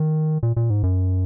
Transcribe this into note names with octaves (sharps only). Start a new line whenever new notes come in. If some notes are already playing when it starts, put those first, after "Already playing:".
Already playing: D#3
A#2
A#2
G#2
F#2